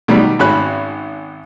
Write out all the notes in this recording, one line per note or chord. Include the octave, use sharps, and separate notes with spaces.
B2 D#3 F#3 G3
G#1 C#4 F#4 B5 F#6